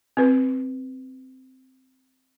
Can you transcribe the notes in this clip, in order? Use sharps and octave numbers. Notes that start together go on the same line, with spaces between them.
C4 B4